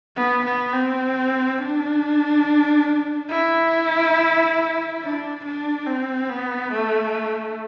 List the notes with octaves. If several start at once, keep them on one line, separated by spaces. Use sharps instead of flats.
B3
B3
C4
D4
E4
D4
D4
C4
B3
A3